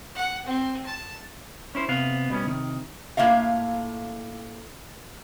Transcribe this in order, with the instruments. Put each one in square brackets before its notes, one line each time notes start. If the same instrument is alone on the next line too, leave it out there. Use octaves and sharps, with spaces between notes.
[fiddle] F#5
C4
A5
[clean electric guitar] C#4 E4 C5
C3 B3 F5
B2 G3 B3 C#4
C3 D#3
[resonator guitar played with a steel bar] A2 A#3 F4 E5 F5